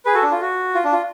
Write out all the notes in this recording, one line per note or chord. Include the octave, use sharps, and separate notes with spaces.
G#4 B4
F#4 A4
D4
F4
F#4
F4
D4
F4